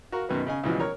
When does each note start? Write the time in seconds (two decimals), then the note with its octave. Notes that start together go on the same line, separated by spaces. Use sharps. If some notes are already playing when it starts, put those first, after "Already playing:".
0.12 F#4 A#4 F5
0.29 F#2 B2 D#3 B3 B4
0.47 C#3 D#5 G#5
0.64 C#2 B2 E3 F3 G3
0.80 A#4 C#5